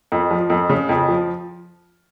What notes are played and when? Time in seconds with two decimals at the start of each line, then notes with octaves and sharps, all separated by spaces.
0.12 F2
0.31 F3
0.50 F2
0.69 C#3
0.89 F2
1.08 F3